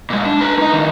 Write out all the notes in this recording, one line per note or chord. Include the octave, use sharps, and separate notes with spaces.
A#2 G#3
D4
B4 A#5
D#4 D#5
A2 D#3